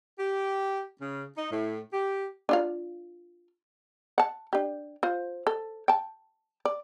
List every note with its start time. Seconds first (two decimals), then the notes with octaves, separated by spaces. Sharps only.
0.18 G4
1.01 C#3
1.36 D#4
1.51 A2
1.93 G4
2.49 D4 F4 F5
4.18 F#5 A5
4.53 D4 G4
5.03 F4 C5
5.47 A4
5.88 G5 A5
6.65 D5